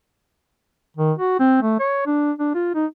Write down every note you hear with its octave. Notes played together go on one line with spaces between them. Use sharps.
D#3
F#4
C4
A3
C#5
D4
D4
F4
D#4